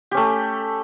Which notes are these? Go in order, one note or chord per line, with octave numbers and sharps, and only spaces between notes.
A3 C#4 G4